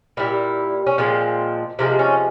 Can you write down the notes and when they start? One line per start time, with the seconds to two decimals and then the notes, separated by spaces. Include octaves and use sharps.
0.17 A#2 G3 E4
0.87 C#4
0.98 A#2 F3 G#3 C4
1.79 C3 F3 G#3 A#3
1.99 C#4